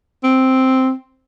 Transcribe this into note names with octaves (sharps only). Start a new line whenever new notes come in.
C4